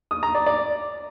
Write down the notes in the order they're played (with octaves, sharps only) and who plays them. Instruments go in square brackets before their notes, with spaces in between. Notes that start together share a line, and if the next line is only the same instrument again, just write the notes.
[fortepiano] D#6
A#5
D5
D5